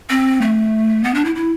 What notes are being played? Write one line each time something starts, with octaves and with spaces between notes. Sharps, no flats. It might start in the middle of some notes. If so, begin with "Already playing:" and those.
C4
A3
B3
D4
E4
E4